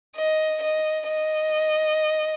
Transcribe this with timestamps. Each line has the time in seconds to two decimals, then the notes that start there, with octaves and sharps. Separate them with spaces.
0.17 D#5
0.62 D#5
1.08 D#5